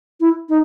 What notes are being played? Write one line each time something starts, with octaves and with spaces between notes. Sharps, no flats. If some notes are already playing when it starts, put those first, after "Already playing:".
E4
D#4